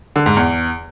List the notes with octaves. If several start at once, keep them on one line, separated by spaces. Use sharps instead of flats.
D3
G#2
E2